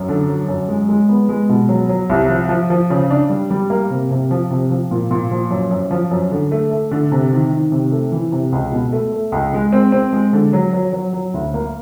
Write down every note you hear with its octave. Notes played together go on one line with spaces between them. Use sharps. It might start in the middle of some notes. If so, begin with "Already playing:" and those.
Already playing: F#2
D3
F#3
F#2
G#3
G#3
B3
G#3
B2
F#3
F#3
C2
F3
F3
F3
C#3
D4
G3
G3
A#3
C3
C3
F3
C3
F3
A#2
A#2
F3
F#2
F#2
F3
F#2
D3
A3
A3
D3
C3
D#3
D#3
C3
A3
E3
C3
C#2
B2
A3
A3
C#2
G#3
C4
C4
G#3
D3
F#3
F#3
F#3
F#3
D2
A#3